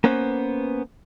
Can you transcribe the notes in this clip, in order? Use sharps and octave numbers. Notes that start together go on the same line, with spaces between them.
A#3 B3 C#4 B4 C5